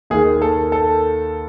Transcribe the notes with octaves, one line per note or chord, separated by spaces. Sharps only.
D#2 D#3 G#4
A4
A4